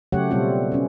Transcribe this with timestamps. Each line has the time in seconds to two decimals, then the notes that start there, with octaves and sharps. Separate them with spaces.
0.12 C#3 F#3 A3 G4 C#5 F#5
0.31 B2 G3 A3 C4 F4 A4
0.72 B3 C#4